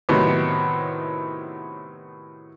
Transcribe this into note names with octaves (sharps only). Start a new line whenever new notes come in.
A2 C3 D#3 F#3 B3